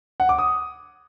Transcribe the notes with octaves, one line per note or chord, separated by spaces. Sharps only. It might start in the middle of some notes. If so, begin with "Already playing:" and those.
F#5
D6
D#6